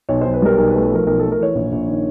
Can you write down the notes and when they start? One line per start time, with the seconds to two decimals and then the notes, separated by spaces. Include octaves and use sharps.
0.09 B1 C#5
0.21 C5
0.25 B1
0.34 B4
0.42 G3 A#4
0.57 B1 A#4
0.70 B4
0.74 A3
0.83 B4
0.91 F3 A#4
1.06 B1 A#4
1.19 A4
1.23 A3
1.31 A#4
1.40 E3 C#5
1.55 A#1
1.72 A#1
1.87 D#3